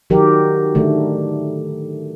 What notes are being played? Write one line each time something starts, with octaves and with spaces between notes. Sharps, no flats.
D#3 F#3 G4 A#4
D3 D#3 A3